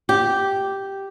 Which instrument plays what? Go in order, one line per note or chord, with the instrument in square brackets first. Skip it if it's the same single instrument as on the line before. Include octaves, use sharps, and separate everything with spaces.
[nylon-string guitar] G4